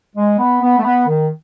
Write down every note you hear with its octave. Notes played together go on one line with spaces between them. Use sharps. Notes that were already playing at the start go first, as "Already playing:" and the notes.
G#3
B3
B3
A3
B3
D#3